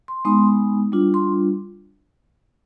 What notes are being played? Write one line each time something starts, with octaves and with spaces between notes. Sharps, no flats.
C6
G#3 B3 D#4 C6
G3 D4 F4
C6